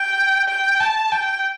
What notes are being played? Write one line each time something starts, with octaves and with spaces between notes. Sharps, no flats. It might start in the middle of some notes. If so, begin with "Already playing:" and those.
Already playing: G5
G5
A5
G5